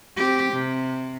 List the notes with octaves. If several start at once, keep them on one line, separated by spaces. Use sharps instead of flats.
C4 G4
C3